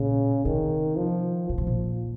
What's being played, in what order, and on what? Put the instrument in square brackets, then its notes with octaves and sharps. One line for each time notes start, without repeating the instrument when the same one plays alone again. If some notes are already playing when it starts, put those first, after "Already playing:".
Already playing: [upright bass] A#2 [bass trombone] C#3
[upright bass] C3 [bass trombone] D#3
[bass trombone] F3
[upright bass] A#2 [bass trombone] F3
[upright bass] C3
A#2